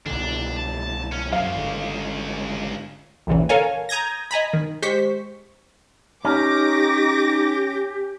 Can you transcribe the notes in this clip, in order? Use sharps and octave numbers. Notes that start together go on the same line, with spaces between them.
C2 B2 D3 D4
A5
C#4
C#2 F#2 C#3 F5
G#1 D3
A#1 D#2 A#2 C#3 E3
A4 A#4 C#5 F5 G#5
A#5 D#6 G6 G#6 A#6
D#5 G#5 A#5 B5
D#3
G#3 G4 C5 C#6 B6
C#4 D#4 G4 D6 A#6